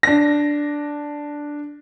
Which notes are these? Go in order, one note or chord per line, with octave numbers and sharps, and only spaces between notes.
D4 A#6